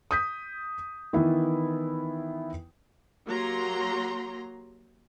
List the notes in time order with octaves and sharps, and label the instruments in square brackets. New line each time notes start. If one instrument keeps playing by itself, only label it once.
[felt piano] D#6 G6 B6
D#3 E3 B3 E4
[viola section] F#3 A#3 G4 A#5 C6